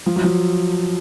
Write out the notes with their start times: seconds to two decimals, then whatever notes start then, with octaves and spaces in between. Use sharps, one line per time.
0.06 F3
0.16 F#3
0.24 F3